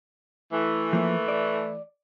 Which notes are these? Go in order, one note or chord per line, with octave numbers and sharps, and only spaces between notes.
E3 A3
F3 A#3
D5